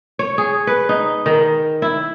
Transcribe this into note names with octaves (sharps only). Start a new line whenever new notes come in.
C#5
G#4
B4
D#4
D#3
E4